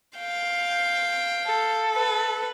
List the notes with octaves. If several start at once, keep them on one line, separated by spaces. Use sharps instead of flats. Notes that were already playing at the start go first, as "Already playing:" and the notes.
F5 G5
A4
B4